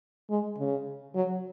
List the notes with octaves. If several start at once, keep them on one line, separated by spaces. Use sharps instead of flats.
G#3
C#3
F#3